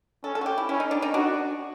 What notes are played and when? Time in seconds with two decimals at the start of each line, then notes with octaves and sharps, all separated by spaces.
0.24 C#4 A4
0.35 A4
0.41 F#4
0.46 G4
0.58 E4
0.69 C#4 E4
0.80 D#4
0.91 D4
1.02 D#4
1.14 D4 F#4